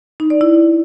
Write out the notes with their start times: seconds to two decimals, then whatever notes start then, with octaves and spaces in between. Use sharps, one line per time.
0.20 D#4
0.30 D5
0.41 E4